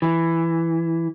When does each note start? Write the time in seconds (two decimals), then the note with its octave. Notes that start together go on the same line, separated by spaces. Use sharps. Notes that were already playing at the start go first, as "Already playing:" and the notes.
0.02 E3